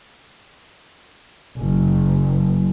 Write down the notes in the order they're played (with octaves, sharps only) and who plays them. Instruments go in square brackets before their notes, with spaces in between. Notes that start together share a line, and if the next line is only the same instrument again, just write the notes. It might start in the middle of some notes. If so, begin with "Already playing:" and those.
[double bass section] F#1